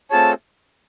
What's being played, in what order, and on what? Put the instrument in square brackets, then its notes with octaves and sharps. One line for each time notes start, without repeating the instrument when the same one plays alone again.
[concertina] A3 C4 F4 G#4 C#5 [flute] A5